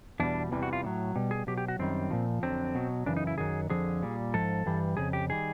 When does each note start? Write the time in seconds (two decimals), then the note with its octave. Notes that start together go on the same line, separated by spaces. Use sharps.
0.20 E2 B2 G3 D4
0.51 E2 C3 E3 G3
0.63 F#4
0.73 F4
0.84 A2 F#3
1.16 B2 G3
1.31 G#4
1.47 B2 F#3 G4
1.58 G4
1.68 F#4
1.79 F#2 D#3 G3 C4
2.11 A#2 F3
2.43 F2 D3 F#3 C4
2.75 B2 F#3
3.06 F#2 C#3 E3 D4
3.17 D#4
3.27 E4
3.38 F#2 D#3 F#3 G#4
3.70 F2 D3 F3 G#4
4.02 A#2 G3
4.34 G#2 F3 A4
4.66 G2 E3 G3
4.97 F2 C#3 G#4
5.13 G4
5.30 D#3 G3 G#4